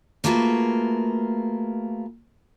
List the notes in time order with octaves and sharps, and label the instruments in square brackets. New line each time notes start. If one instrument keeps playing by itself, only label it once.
[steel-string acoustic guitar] A3 A#3 F4 F#4 G#4 B4